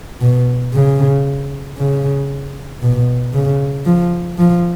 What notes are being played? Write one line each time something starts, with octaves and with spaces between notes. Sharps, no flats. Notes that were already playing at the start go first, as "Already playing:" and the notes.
B2
C#3
C#3
B2
C#3
F3
F3